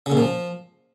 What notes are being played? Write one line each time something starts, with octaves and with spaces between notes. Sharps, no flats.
C#3
A#2
F3